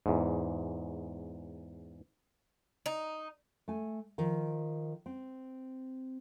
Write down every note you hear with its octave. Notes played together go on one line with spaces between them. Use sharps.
E2 G#2
D#4
A3 G#5
D#3 F3
C4